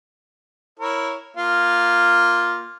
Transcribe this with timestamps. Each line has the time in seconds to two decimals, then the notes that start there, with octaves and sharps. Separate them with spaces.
0.79 E4 A#4 C#5
1.37 A#3 F4